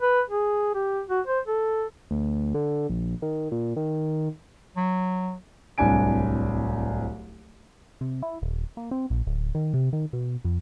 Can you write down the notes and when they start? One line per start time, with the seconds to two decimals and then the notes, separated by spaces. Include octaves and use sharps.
0.01 B4
0.30 G#4
0.75 G4
1.10 F#4
1.27 C5
1.47 A4
2.11 D2
2.55 D3
2.89 A#1
3.22 D#3
3.52 A#2
3.76 D#3
4.77 F#3
5.78 D1 C2 D4 G#5 D7
8.01 C3
8.22 E4
8.42 D#1
8.77 A#3
8.91 C4
9.10 A#1
9.27 D1
9.55 D#3
9.74 C3
9.93 D#3
10.13 B2
10.44 F2